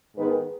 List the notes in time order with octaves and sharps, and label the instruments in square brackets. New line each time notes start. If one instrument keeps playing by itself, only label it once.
[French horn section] G#2 D#3 G#3 B3 B4